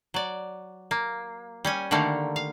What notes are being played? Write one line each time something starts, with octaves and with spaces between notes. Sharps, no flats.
F#3 D5
A#3
G3 C#4 G#5
D3 D#3 G3 A3 A#3
F5